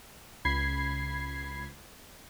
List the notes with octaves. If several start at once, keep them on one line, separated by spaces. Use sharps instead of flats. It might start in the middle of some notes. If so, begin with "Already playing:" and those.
C#2 B5 G#6 C7